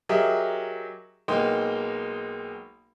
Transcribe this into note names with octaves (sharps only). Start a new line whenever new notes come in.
F#3 G4 G#4 A#4 D#5 E5
B1 G#3 A#3 D#4 G5 C6